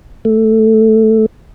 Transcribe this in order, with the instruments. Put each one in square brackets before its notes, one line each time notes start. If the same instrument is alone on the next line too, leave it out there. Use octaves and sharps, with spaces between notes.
[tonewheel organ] A3